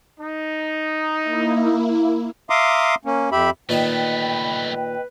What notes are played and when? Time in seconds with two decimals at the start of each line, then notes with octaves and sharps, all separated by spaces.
0.20 D#4
1.21 A#3 E4
2.50 E5 F5 A#5 C6 D6 D#6
3.05 A#3 C#4
3.32 F2 G4 E5 B5
3.69 A#2 D#3 A3 B3 D#4 B4 D#5 G5